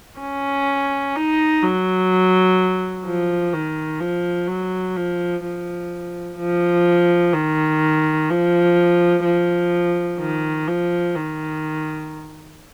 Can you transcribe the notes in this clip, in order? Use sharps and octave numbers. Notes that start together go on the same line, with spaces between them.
C#4
D#4
F#3
F3
D#3
F3
F#3
F3
F3
F3
D#3
F3
F3
D#3
F3
D#3